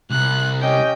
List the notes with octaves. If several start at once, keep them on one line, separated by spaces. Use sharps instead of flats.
C2 F#6
C#4 G4 D#5 G5